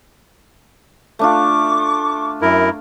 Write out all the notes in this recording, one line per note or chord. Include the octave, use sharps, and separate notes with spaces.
A3 D4 F4 C#6 D6
F#2 E4 A#4